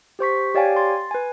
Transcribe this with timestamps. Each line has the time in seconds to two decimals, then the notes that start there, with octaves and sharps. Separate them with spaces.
0.19 G4 C5 C#6 B6
0.54 G4 C#5 D5 F5 G5 G#5
0.76 C6 A6
1.11 B4 G#5